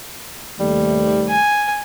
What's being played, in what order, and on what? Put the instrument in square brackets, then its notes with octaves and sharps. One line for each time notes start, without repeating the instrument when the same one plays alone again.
[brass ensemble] D#2 C3 A3 [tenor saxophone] G3
[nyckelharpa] G#5